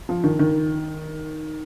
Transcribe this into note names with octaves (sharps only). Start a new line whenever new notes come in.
F3
D#3
D#3